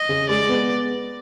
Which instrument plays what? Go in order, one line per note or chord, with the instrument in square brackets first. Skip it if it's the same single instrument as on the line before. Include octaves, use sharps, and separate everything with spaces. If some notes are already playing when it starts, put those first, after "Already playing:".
Already playing: [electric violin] D#5
[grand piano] C#3
[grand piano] G#3 [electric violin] D5
[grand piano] B3